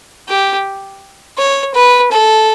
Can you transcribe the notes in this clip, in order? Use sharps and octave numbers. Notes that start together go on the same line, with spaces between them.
G4
C#5
B4
A4